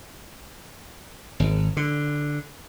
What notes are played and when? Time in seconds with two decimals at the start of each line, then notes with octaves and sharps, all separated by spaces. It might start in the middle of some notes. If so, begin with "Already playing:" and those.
1.40 G#1
1.77 D3